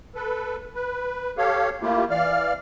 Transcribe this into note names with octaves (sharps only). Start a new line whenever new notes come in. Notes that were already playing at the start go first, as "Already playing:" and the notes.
A4 B4
B4
G4 A4 C#5 F5
A3 A#3 E4 F4 G4
E3 D5 F5 F6